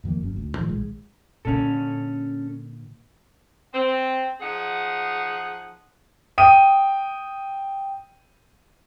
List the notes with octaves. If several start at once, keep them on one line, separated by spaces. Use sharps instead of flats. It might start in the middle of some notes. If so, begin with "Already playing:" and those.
F2 D#3 F3 A#3
G1 F#2
D2
A2 D#3 F3
A#1 G#3
A#2 D3 C#4 A4
C4
F3 D#4 G#4 F#5
G5 D#6 D#7